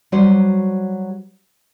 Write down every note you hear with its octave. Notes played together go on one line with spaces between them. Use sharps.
F#3 G3 F#4 B4 C5